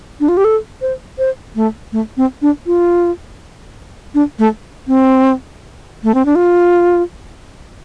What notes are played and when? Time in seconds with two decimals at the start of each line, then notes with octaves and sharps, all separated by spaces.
0.20 D4
0.29 F4
0.37 G4
0.44 A4
0.82 C5
1.19 C5
1.56 A3
1.92 A3
2.17 C4
2.42 D4
2.67 F4
4.14 D4
4.39 A3
4.88 C4
6.04 A3
6.14 C4
6.26 D4
6.35 F4